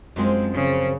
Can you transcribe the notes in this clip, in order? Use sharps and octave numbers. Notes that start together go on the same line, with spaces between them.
F#2 F3 G#3 C4
C#3